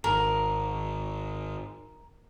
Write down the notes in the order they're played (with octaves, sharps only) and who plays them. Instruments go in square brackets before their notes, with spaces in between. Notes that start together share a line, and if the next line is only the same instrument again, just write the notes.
[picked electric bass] G#1 [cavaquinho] A#4